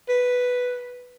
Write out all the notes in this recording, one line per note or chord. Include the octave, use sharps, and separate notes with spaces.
B4